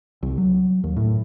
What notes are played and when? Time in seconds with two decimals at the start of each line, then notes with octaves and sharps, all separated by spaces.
0.23 C2
0.38 F#3
0.84 D#2
0.97 A2